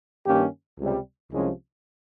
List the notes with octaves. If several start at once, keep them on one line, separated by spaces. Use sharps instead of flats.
G2 D#3 A#3 C#4 G4
C#2 C3 G3
C2 C3 F3 G#3 C#4